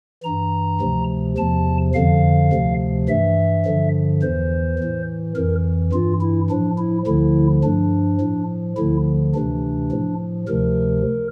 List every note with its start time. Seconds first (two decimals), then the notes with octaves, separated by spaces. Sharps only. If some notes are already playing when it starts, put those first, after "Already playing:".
0.23 G2 E3 A#5
0.80 D2 C3 F3
1.37 E2 C3 F3 A5
1.94 F2 D3 F3 F5
2.52 D2 C3 F3
3.08 G2 E3 E5
3.65 G2 D3 F3
4.22 E2 E3 C5
4.78 E3
4.84 A2
5.35 F2 E3 A#4
5.92 G2 E3 F4
6.21 E4
6.50 A2 F3 D4
6.78 E4
7.06 D2 D3 F3 E4
7.64 G2 F3 D4
8.21 A2 F3
8.77 D2 D3 F3 E4
9.35 D2 C3 E3 D4
9.91 A2 F3
10.48 D2 C3 F3 A#4